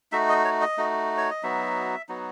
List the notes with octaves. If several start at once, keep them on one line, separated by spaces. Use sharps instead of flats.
A3 D#4 F#4 E5
D#5
C#5
D#5
A3 D#4 F#4
C#5
D#5
F#3 B3 D#4 F#4 E5
F#3 B3 D#4 F#4